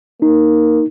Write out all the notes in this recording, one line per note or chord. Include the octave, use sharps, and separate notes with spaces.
A#3 D#4